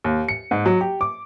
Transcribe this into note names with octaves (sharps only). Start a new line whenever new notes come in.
D#2
C#7
G#2
F#3
G4
D6